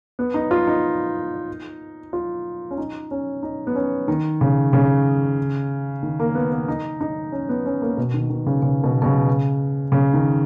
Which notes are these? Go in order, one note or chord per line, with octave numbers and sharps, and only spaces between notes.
B3
D#4
F4
D#4
F4
C#4
D#4
C#4
D#4
B3
C#4
D#3
C#3
C#3
D#3
A#3
B3
B3
D#4
D#4
C#4
B3
C#4
A#3
B2
D#3
D#3
C#3
C#3
B2
B2
C#3
C#3
D#3